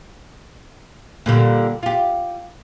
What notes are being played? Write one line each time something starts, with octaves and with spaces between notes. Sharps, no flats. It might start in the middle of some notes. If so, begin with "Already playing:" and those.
A#2 D3 G3
F4 G4